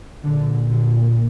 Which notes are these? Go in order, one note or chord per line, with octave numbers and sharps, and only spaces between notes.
A#2 D3
D3